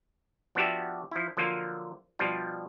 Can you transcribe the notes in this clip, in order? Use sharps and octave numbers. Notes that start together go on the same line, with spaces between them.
F3 B3 D4 F#4 G4 E5
F3 E4
D3 F3 F#3 A#3 F4
B2 F3 G3 D4 F4